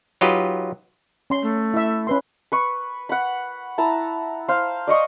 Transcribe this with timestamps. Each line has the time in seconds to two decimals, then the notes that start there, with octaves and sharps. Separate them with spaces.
0.21 F#3 D#4 F4 G4 B4 D#5
1.30 C#4 C6
1.43 A3
1.74 E4 E5
2.07 C#4 B4 C6
2.52 B4 C#6
3.09 F#5 B5
3.78 E4 A5 A#5
4.48 C5 F5
4.87 D5 D#5 C#6 D#6